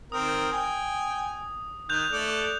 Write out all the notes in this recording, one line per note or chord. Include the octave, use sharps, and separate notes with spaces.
D#3 C4 A#4 D#6
G5 G#5
D#3 F#6 G6 F7
A3 A4 D5